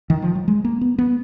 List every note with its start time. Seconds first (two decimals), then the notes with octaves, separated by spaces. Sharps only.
0.10 D#3
0.22 F3
0.35 F#3
0.48 G#3
0.65 A#3
0.81 B3
0.98 B3